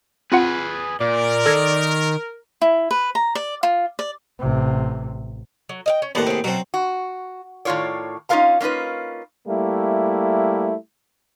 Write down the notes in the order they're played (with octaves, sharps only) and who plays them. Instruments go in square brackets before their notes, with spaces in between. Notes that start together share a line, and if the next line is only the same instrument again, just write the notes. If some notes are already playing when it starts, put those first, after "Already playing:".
[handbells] C4 F4 F#5 [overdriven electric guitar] G#4 B4
[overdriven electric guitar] A#2 [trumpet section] A#4 [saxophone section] D5
[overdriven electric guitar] D#3 [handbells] A4 G#6 A#6
[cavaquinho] E4
B4
A#5
D5
F4
D5
[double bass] A1 C3
[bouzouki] F#3
D#5 F5 G5
C#4
[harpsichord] D#2 A2 F#5 [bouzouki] B3 D4 C5
[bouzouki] C4 G#4
[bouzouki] B2 A5 [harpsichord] F#3 C4
[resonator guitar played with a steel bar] F#4
A2 D#3 E3 F4 C#5 D5
C#4 D#4 F4 A#4 F5 A#5
A#3 C#4 D#4 F4 B4
[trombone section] G3 A3 A#3 E4